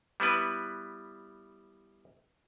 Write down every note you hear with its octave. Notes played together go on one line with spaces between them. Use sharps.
G3 B3 E4 B4